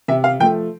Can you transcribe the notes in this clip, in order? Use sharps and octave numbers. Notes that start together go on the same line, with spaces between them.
C3 E5
F5
F3 A3 G5